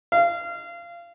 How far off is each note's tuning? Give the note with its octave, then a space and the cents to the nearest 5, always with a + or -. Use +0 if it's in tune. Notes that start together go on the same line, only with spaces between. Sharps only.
F5 -25